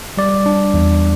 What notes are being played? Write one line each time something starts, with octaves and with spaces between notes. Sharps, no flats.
G3 D5
D4
E2